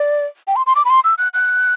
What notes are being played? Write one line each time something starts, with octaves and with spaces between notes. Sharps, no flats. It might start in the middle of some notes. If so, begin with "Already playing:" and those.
Already playing: D5
G5
C6
C6
D6
B5
C6
E6
F#6
F#6